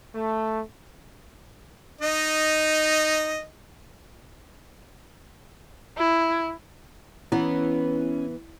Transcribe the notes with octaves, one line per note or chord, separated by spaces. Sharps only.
A3
D#4 D#5
E4
E3 B3 C#4 E4